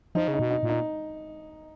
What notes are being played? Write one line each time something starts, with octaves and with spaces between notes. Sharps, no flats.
F3 D#4
C#3
D#4
B2
D#4
A#2
D#4